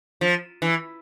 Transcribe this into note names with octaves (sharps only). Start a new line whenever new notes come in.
F3
E3